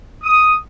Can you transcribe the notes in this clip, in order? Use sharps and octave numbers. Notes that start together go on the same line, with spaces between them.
D#6